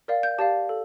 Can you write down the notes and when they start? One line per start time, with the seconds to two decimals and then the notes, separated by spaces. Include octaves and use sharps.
0.08 A#4 D5 F5
0.23 G6
0.38 G4 D5 F5 A5
0.69 A4